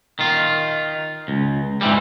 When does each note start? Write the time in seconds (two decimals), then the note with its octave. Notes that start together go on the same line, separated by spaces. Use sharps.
0.19 D#3 F4
1.28 C#2
1.81 G#2 C3 E3 G3